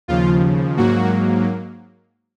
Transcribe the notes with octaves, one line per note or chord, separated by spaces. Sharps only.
D#2 C#3 F3 F4
G#2 F#3 A#3 F#4